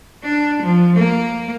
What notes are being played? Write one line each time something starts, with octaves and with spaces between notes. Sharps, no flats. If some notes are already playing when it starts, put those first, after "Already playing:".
D4
F3
A#3